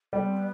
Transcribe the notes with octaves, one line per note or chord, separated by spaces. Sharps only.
G3 B3
C4
B3